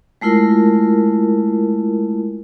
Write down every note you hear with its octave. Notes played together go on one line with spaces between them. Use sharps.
G#3 A3 E4 F4 A#4